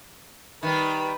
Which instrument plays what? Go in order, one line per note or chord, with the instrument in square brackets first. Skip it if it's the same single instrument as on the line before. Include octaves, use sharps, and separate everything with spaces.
[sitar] D#3 G3 [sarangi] B4